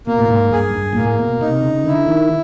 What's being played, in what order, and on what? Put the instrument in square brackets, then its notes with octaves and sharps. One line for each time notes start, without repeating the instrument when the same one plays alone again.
[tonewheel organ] B2 [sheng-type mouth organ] A#3
[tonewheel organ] A2
G#2
[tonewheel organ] G2 [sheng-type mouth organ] G#4
[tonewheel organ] G2
A#2
[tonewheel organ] A2 [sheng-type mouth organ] A#3
[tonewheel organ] B2
[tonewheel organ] C3 [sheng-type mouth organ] D#4
[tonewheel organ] C#3
[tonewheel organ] D3 [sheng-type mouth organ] E4
[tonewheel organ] D#3